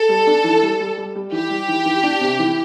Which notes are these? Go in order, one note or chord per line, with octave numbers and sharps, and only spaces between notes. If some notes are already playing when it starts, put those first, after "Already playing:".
Already playing: A4
G3
D4
E3
G3
G3
G3
G3
E3 G4
G3
E3
E3
D4
C3
E3